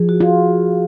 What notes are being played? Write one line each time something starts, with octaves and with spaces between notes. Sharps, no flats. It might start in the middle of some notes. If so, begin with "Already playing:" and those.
Already playing: F3 G#4
F#4
F4 G#4